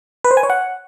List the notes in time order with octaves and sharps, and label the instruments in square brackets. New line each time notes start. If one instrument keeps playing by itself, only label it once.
[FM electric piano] B4
C5
G#5
C#5
F#5